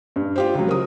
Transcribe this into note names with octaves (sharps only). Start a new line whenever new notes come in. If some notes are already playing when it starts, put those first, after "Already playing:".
G2
F4 G4 C5
C#2 F#3
A#4 D#6